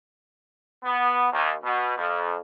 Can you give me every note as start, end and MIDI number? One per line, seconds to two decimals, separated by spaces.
0.84 1.28 59
1.32 1.53 39
1.64 1.93 47
1.97 2.36 41